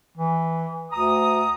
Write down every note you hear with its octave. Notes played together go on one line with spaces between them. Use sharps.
E3
D2 A#5 D#6